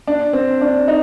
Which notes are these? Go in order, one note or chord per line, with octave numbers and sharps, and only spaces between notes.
D4
C4
D4
D#4